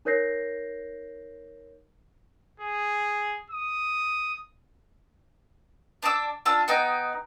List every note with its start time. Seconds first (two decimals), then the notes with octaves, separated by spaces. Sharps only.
0.05 D#4 A#4 C#5 G6 A#6 C7
2.60 G#4
3.51 D#6
6.03 D4 A5 D6 E6
6.45 D4 F4 A5 E6
6.68 B3 D#4 G5